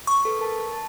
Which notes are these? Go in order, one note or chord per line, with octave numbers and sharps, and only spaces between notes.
C#6
A4 B4
A#4 A5
A5